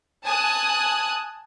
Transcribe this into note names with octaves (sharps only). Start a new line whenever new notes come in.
G#5 A5 D#6 F#6